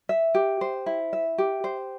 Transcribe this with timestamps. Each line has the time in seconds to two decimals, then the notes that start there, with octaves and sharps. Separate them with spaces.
0.09 E5
0.35 G4
0.61 C5
0.86 E4
1.13 E5
1.38 G4
1.64 C5